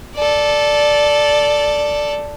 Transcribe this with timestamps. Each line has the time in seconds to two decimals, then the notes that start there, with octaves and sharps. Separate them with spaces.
0.15 A4 D5